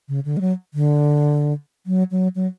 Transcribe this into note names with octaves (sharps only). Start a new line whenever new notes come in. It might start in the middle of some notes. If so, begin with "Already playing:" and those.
C#3
D3
G#3
F#3
D3
F#3
F#3
F#3